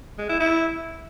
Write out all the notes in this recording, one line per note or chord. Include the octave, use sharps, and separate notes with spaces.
G#3
E4
E4